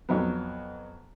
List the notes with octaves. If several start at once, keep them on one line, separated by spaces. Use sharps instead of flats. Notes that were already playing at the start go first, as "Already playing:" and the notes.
F2 F#3 B3